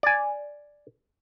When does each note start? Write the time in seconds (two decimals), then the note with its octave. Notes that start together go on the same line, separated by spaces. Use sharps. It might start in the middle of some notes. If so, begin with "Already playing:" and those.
0.03 D5 G#5